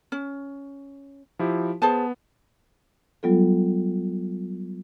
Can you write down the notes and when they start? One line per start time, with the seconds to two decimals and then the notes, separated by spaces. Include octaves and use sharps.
0.12 C#4
1.39 F3 E4 G4
1.82 B3 G#4 C5 A5
3.23 F#3 G3 B3 F4 A4